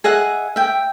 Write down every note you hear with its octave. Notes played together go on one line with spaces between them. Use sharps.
G#4 D#5 E5 F#5
E5 G5